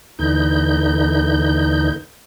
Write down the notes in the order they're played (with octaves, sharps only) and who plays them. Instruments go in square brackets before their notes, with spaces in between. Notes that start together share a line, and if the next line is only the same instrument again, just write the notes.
[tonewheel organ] D#2 D3 E3 D#4 G6